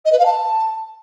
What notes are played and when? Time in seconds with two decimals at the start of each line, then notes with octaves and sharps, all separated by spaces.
0.05 D#5
0.12 B4
0.19 F5
0.25 A5